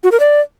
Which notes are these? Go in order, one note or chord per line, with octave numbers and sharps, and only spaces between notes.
F#4
A#4
D5